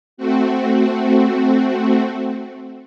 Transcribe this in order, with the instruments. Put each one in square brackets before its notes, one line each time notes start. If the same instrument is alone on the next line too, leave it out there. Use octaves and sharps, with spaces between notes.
[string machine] A3 C4 F#4